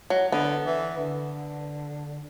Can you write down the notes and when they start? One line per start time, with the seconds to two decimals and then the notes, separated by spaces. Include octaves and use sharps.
0.10 F#3
0.32 D3 B3
0.65 E3
0.98 D3